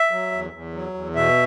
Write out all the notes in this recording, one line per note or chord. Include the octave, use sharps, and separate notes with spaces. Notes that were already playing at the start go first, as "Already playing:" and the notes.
Already playing: E5
F#3
E2
E2
F#3
E2
B2 E5